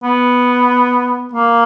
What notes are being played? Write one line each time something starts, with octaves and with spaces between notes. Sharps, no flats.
B3
A#3